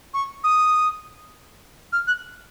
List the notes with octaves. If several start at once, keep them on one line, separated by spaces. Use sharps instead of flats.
C#6
D#6
F6
F#6